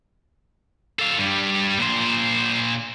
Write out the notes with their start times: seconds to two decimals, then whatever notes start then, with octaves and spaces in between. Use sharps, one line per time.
0.99 A4 F5
1.18 G2 G3
1.79 A#2 C5